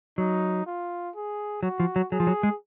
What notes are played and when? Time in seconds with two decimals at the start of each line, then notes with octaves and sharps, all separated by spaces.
0.18 F#3 D#4
0.66 F4
1.15 G#4
1.63 F#3 F#4
1.80 F3
1.96 F#3
2.12 F#3 G#4
2.20 F3
2.27 F#3
2.43 G#3